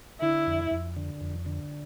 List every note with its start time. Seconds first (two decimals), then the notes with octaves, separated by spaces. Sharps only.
0.21 D3 E4
0.47 F2
0.71 F2
0.97 D3
1.21 F2
1.46 D3